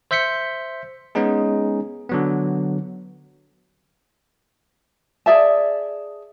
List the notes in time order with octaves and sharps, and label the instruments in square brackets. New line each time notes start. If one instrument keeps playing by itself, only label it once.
[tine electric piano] C5 E5 G6 B6 C#7
G#3 B3 C#4 D#4 G#4
D3 F#3 B3
[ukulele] G#4 D5 E5 A5